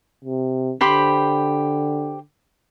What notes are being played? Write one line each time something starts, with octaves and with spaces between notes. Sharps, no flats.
C3
D3 G4 C5 B5